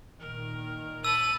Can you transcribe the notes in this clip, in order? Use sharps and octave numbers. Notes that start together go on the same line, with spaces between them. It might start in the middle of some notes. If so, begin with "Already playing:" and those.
A#2 D#3 A#4
A5 B5 E6 D#7